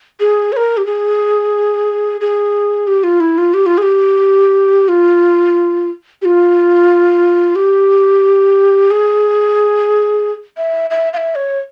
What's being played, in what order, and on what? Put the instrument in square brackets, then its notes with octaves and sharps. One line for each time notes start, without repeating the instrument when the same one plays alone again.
[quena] G#4
C#5
A#4
G4
G#4
G#4
G4
F4
E4
F4
G4
F4
G#4
G4
F4
G4
F4
G4
G#4
E5
E5
F5
E5
C#5